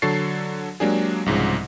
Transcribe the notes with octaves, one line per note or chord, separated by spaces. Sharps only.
D3 F#3 A4 C#6 A6 C7
F#3 G#3 A#3 D4 G4 G#4
C2 G#2 C#3 F3